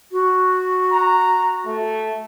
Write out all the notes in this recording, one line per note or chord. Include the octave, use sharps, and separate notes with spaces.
F#4
A#5
A3